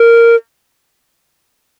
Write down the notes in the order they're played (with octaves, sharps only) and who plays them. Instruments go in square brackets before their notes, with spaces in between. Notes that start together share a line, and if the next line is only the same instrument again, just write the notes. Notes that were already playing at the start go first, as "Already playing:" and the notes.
Already playing: [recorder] A#4